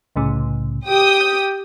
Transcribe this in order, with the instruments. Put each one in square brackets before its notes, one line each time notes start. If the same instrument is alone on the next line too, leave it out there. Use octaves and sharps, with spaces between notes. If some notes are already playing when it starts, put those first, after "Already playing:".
[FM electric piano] C2 A2 C#3
[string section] G4 G5 D#6
[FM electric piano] G6